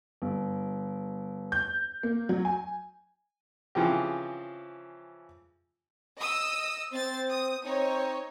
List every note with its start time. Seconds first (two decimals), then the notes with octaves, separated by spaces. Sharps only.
0.22 G1
1.52 G6
2.03 A#3
2.29 F#3
2.45 G#5
3.75 C#3 E3 F3 C4 G4
6.18 D#5 D#6 E6
6.92 C4 C5 A6
7.30 D#6
7.64 C4 D#4 C#5